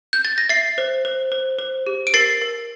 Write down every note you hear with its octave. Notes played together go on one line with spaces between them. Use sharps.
G6
A6
A#6
E5 A6 C7
C5
C5
C5
C5
G4
D7
A#4 A6 C7
A#4